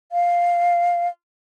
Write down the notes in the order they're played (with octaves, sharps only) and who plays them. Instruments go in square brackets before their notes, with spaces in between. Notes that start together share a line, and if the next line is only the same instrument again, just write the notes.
[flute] F5